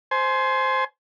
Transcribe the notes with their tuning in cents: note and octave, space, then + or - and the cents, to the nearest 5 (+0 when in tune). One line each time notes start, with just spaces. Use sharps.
C5 +0 G#5 +30